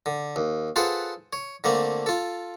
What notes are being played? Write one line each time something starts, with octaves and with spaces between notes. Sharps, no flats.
D3
D#2
F4 G#4 A4 B4 C5 F#5
C#5
D3 A3 A#3 C4
F4 A4